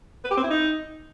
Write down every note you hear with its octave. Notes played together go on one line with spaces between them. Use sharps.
B4
G4
C4
E4
D#4